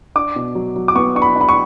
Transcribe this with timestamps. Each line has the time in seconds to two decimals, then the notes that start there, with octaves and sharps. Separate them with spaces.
0.16 D4 D6
0.36 B2
0.55 F#3
0.76 F#3
0.88 D6
0.95 B3 C#6
1.15 D4 C#6
1.22 B5
1.36 D4 B5
1.49 C#6